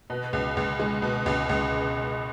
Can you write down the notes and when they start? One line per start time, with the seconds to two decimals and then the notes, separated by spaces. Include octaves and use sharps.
0.10 B2
0.33 C#2
0.57 C#2
0.79 G#3
1.02 B2
1.26 C#2
1.49 C#2